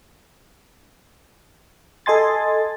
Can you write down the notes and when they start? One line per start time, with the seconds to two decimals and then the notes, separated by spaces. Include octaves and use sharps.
2.06 A4 D#5 G#5 C6 A6